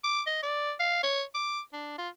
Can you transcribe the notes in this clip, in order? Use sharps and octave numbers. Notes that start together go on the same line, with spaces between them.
D6
D#5
D5
F5
C#5
D6
D4
F4